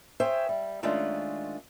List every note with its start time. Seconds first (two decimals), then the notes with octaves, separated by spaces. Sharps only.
0.20 G#4 C5 C#5 E5 G5
0.49 G3
0.83 D#3 G#3 A3 C#4 D4 F4